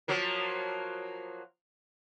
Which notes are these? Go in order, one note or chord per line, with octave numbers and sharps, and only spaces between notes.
F3 F#3 A#3